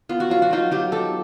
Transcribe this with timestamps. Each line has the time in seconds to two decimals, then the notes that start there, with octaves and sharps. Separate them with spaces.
0.09 B3 F4
0.20 F#4
0.30 F#3 F4
0.42 F#4
0.51 F#3 D#4 F4
0.71 F#3 F4 G4
0.92 D#4 G4 A4